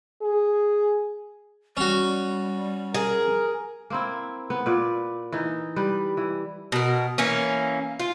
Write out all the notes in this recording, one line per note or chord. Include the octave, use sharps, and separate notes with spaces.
G#4
G3 C#4 F#4
G#4 A#4
A#3 C4 E4
B3
A#2 B4 D5
E3 D#4
G3 B4
E3
B2 A#4
E3 A#3 C#4
F4